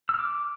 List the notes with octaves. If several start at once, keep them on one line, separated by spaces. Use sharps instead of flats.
E6
F6
D6